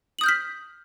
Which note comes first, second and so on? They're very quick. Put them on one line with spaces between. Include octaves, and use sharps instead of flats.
F#7 D#6 G6 F6 B6